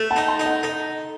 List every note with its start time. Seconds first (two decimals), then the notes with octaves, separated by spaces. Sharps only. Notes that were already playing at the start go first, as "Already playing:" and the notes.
Already playing: A3
0.10 F#5 A5
0.16 D#4
0.28 A5 C6
0.40 D#4
0.45 D#5 F#5
0.63 D#4 A4